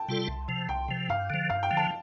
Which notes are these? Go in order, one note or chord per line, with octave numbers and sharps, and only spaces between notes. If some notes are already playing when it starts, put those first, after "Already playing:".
Already playing: G5 A5
C3 G3 F4 A4
C2
C3 F3
C2 G5
C3 F3
G2 F5
D3 F3
G2 F5
G5
D3 F3
A5